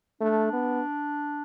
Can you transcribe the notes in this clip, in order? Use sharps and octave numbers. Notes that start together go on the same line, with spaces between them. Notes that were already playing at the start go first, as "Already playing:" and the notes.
A3 D4
B3